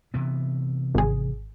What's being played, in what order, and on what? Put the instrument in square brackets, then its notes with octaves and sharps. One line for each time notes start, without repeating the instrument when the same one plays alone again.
[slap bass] C3 E3 B3
[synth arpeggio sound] G#1 G#4